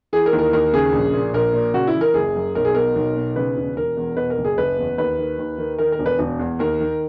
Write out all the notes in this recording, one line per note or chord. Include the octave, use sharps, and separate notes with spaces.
E3 G#4
A#4
D#2
A#4
D#2 A#4
C#3 G#4
A#1
A#2
A#1 A#4
A#2
C#3 F#4
E4
E3
A#4
F#1 G#4
F#2
B1 A#4
G#4
B2 A#4
B1
B2
C#3 B4
E1
E1 A#4
E2
B2 B4
A#4
F#1
G#4
F#1 B4
E2
D#2 B4
D#3
D#2
D#3
D#3 A#4
A#4
E1
B4
E1
E2
D#2 A#4
D#3